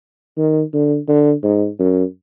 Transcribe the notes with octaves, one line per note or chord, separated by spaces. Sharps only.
D#3
D3
D3
G#2
F#2